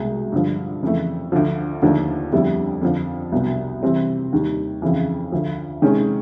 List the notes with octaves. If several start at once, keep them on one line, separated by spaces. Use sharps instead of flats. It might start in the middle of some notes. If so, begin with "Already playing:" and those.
Already playing: C2 B2 G#3
G2 D3 F3
F2 C#3 E3 A3
D2 D3 F3
D#2 D3 F3 A3 D4
F2 D3 G3 B3 E4
F2 D3 F3
C2 B2 F#3 B3
C3 E3 G3 C4
D#2 D#3 G3
F2 C#3 E3
D2 D3 F3
C3 D#3 G#3 C#4